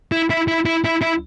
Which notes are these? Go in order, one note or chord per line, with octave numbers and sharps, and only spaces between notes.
E4
E4
E4
E4
E4
E4